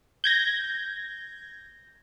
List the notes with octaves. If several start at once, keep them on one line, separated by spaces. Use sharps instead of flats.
G6 G#6 A#6